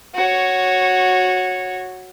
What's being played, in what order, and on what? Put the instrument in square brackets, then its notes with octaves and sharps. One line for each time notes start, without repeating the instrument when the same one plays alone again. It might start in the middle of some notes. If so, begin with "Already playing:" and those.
[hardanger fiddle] F#4 C#5